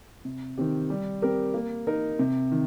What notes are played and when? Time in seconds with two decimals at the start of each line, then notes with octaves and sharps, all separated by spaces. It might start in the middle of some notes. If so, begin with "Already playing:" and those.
0.25 C3
0.57 D#3 C4 G4
0.90 G3
1.22 C4 G4 A#4
1.54 A#3
1.87 D#4 A#4
2.19 C3
2.51 D#3